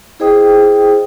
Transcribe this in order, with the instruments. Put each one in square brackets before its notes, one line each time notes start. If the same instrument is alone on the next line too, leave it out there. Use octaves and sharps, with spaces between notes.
[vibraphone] E4 G#4 C5 D#5 G5 D#6